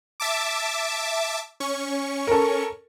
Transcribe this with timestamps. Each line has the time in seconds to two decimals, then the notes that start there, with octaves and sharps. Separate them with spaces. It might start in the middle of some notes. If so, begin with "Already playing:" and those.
0.20 E5 A5 D6
1.60 C#4 C#6
2.27 A4 A#4